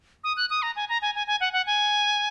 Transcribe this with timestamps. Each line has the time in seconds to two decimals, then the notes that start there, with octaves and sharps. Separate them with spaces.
0.24 D#6
0.37 F#6
0.50 D#6
0.62 A#5
0.76 G#5
0.89 A#5
1.02 G#5
1.15 G#5
1.27 G#5
1.40 F#5
1.53 F#5
1.66 G#5